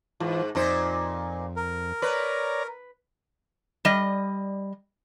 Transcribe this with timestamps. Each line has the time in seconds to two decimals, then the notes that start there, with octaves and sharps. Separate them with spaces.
0.20 G#2 E3 F4
0.55 F2 A#2 D#4 C5
1.56 A#4
2.02 B4 C#5 D5 A#5
3.85 G3 D#5